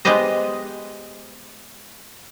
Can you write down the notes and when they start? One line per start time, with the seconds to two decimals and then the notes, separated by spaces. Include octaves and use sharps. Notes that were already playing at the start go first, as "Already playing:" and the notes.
0.05 G#3 B3 G4 B4 C5 D#5